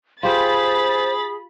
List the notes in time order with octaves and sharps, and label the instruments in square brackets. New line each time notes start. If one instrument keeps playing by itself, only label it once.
[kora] F4 G4 [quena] G#4 [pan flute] C5 [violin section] B5 A6